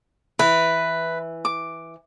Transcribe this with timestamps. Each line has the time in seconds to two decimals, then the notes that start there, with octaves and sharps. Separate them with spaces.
0.39 E3 B4
1.45 D6